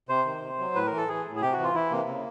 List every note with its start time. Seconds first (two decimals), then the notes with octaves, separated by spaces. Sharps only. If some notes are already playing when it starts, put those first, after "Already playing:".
0.09 C3 C5
0.25 D#3
0.42 C3
0.59 F#3
0.75 A2 B4
0.86 A#4
0.91 E3
0.97 A4
1.08 E3 G#4
1.25 A2
1.36 G#4
1.42 C3 G4
1.53 F#4
1.58 E3
1.64 F4
1.75 E3 E4
1.91 C3 A#3
2.08 C#3